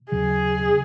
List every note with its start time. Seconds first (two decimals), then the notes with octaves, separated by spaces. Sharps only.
0.12 D#2 C#3 F#3 G#4
0.69 C#3